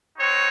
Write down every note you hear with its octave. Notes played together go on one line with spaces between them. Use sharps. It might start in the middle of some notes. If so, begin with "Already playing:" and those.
C4 D#4 F#4 C#5